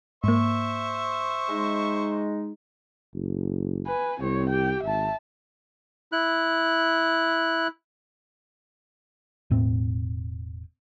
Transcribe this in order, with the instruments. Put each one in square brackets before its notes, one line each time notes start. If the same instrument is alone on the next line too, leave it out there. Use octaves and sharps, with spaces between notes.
[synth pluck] G#2 A#3 [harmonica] C5 E5 C#6
[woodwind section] G#3 D#4
[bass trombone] F#1
[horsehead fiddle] B4 G#5
[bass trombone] C2 [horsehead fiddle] C4 C#5
[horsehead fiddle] G4 G5
[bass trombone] G#1 [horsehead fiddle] E5 A5
[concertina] E4 F#6
[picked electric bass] E1 A2 C4